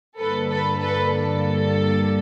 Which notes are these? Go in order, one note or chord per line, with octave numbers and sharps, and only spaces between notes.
G2 D3 G3 A#3 A4 B4
A4 B4
A4 B4
A4